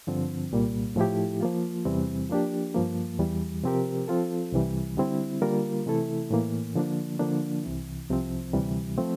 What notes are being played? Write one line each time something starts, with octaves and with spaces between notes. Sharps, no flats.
G2 D3 F3 C4
C2 A#2 G3 A#3
A2 F3 A3 E4 G4
F3 A#3 F4
E2 C3 E3 G3 C4
F3 A#3 D4 G4
G2 F3 A#3
E2 E3 G3
C3 F3 C4 G4 A#4
F3 C4 F4 A4
C2 C3 E3 G3
D3 G3 C4 E4
D3 G3 A#3 F4 A#4
C3 E3 A3 E4 A4
A2 E3 A#3
D3 F3 A#3 D4
D3 F3 A#3 D4
C2 C3 E3
C2 C3 F3 C4
D2 C3 E3 G3
F3 A3 C4